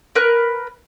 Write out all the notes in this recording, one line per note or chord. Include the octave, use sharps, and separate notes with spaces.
A#4 B4 F#6